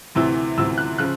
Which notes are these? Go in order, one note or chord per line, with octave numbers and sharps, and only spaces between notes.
D2 C3 E3 E6
D2 C3 E3 E6
F#6
C#3 F3 F#6